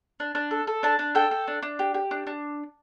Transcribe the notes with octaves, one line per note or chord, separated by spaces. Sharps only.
D4
D4
A4
A4
D4 A5
D4
A4 G5
A4
D4
D4
G4
G4
D4
D4